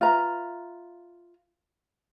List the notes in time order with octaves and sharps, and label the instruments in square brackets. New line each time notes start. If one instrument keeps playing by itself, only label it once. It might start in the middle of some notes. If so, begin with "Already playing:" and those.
[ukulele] F4 B4 E5 A#5